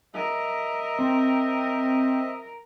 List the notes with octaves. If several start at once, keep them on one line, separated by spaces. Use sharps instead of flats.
A#4 D#5 E5
C4